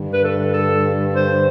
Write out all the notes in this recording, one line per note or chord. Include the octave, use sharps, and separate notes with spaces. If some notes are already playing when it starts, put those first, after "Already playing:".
Already playing: G2 D3
B4
A4
A4
C5